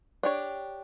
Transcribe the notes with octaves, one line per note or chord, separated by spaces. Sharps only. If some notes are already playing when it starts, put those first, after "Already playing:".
D4 G4 C#5